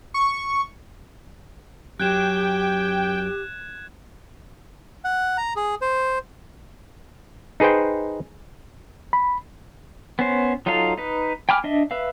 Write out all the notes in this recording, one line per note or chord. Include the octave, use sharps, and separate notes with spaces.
C#6
F#2 F#3 G4 G5 F#6 G#6 E7
F#5
A#5
G#4
C5
D#4 G#4 B4 C5 G5
B5
B3 C#4 C5
F#3 D#4 F4 A4 F5
D#4 B4
G5 G#5 B5 D6 F6
D4 D#5 E5
B4 E5 F5